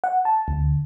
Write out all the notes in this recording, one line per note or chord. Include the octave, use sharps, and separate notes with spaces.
F#5
A5
D2